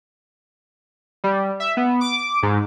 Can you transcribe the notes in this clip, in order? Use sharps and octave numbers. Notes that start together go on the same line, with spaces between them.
G3
E5
B3
D6
G#2